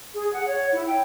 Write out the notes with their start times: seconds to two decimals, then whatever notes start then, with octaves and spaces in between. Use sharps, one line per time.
0.15 G#4
0.33 F#5
0.47 C#5
0.72 E4
0.86 G5